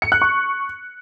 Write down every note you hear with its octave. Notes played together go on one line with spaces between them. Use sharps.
C#7
F#6
C#6